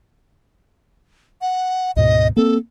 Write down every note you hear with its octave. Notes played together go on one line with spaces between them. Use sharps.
F#5
D2 G#2 B2 D#5
A#3 C4 A4